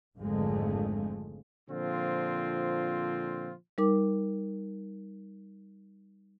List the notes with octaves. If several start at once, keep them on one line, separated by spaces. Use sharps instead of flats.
G#1 F2 D3 F3 G#3 A3
A#2 D3 F3 C4 F4
G3 D#4 A#4 D6